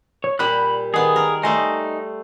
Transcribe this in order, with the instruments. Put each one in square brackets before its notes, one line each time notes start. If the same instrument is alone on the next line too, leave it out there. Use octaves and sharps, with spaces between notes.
[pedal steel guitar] C#5
[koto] A#2 G3 G4 [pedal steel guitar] B5 F#6
[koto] D#3 B3 [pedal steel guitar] G#4
[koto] A#4
[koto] G3 A3 C5 [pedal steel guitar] D#4 D#5 G#5